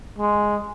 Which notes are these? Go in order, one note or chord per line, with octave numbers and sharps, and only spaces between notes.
G#3